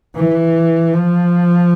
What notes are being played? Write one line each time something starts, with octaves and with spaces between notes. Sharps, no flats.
E3
F3